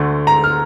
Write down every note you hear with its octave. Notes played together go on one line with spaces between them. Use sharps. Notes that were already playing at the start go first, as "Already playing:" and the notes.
Already playing: D2 D3 A3
A#5
F6